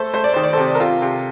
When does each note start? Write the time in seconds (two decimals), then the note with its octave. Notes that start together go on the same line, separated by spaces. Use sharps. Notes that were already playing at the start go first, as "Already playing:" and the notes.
Already playing: A3 A4 C5
0.14 A3 C5
0.24 D5
0.34 D#3 C5
0.43 D5
0.53 C3 A4 C5
0.75 A#4
0.80 C3 F4 A4
1.02 C3